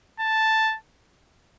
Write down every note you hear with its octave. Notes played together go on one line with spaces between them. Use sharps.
A5